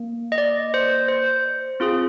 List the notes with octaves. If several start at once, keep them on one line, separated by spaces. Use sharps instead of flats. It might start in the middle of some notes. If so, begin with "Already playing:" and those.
Already playing: A#3
D#5
D5
C5
C5
C4 F4 G#4